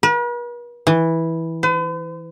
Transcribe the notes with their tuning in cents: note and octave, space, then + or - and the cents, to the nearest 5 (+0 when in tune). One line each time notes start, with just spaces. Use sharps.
B4 -45
E3 -10
B4 +45